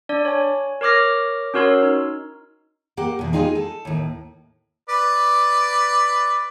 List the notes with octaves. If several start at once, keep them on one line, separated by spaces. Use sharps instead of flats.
D4 D5
C#5 G#5
A#4 C#5 D6 F6 A#6
C#4 F#4 A#4 C#5 C6 E6
D#4
A#3 G4 F#5
E2 B2
G#3 D#4 F4 G4 G#4
A4
D#2 A2
B4 D5